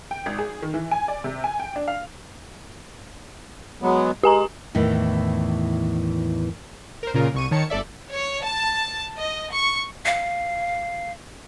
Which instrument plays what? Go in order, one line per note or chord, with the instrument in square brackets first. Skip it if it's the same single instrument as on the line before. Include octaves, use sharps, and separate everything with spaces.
[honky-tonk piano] G5
G#1
G#4
D#3
E3
G#5
D5
C3
G#5
G5
D4
F5
[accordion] F#3 G#3 B3
[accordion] G#3 [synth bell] G4 G#5 A#5
[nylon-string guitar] E2 A2 D#3 E3
[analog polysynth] A#4 C5
A#2 C#3 F4 A#4
C2 C#6 D#7
D#3 C#5 A5 C#7
G1 A4 D5 E5
[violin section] C#5
A5
D#5
C#6
[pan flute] F5